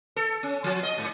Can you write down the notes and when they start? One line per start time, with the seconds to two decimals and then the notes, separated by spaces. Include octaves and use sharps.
0.16 A4
0.43 C#4
0.64 F3
0.83 D#5
0.98 G#2